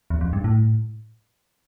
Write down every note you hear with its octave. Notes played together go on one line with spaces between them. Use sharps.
E2
F2
G2
A2